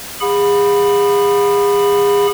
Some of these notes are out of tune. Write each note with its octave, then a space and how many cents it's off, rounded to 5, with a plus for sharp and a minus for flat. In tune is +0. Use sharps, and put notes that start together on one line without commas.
G#4 -35 F#5 -45 B5 +0